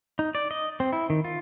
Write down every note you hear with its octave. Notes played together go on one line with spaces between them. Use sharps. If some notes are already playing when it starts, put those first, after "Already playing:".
D#4
D5
D#5
C4
E4
D#3
F4